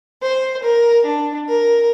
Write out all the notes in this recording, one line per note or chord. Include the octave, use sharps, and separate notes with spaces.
C5
A#4
D4
A#4